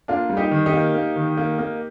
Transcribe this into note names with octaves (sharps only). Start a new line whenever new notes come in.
A#3 D4 F4
G3
D#4 G4
D#3
D#4 G4
A#3
A#3
D#3
A#3
A#3